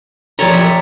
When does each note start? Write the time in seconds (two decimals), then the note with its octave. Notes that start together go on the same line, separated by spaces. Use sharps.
0.39 F3 G4 A4 A#4 C#5 D5
0.54 B5